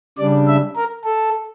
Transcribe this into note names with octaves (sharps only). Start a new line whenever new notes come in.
C#3 G3 D4 D5
E5
A#4
A4